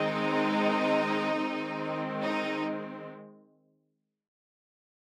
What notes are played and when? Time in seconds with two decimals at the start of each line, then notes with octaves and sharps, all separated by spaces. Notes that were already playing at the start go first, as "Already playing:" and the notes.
Already playing: D#3 G#3 C4 D#4
1.38 D#3 G#3 C4
2.23 D#4